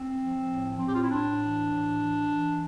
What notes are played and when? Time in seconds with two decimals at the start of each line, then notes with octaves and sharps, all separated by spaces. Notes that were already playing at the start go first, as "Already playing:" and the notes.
Already playing: C4
0.19 F3
0.49 A2
0.79 A2 C4
0.87 G4
0.94 F4
1.02 E4
1.09 A2 D4
1.39 E3
1.70 A2
2.00 E3
2.29 E3